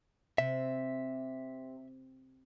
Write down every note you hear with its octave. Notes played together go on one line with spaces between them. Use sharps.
C3 E5